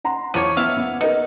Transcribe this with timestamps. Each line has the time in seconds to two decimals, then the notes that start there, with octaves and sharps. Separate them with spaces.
0.04 F#5 A#5 C6
0.34 E2 F3 C#5 D6 D#7
0.57 B3 E5 F5
0.77 B3
1.01 D#4 A#4 B4